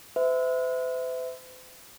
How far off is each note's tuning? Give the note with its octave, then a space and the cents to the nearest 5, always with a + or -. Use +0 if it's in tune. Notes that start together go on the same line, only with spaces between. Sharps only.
C5 -45 E5 -10